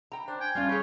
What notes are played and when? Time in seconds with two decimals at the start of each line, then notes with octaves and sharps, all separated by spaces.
0.12 G5 A#5
0.28 D4 C5
0.40 G5 G#5
0.55 A2 G3 C#4 F4 D5 F5
0.69 G4 G#4 C#5